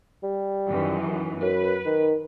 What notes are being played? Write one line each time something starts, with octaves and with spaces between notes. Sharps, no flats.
G3
F#2 D#3 E3
F#2 B4
D#3